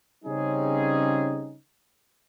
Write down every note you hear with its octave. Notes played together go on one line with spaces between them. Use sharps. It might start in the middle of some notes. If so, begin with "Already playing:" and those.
C#3 G3 C4 C#4 D#4 G#4